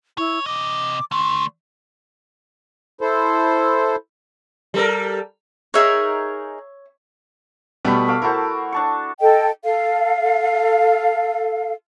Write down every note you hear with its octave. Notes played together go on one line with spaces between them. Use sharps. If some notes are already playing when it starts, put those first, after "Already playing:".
E4 C#5
C3 D#5 D6
D3 A3 C6
E4 A4 C5
G3 A4 A#4
D#4 G#4 A#4 C#5 E5
B2 G3 A3 B3 B5
A3 F5 D6
E4 F#4 A4 A#4 C5
D4 A5 C#6
A4 D#5 G5
A4 F5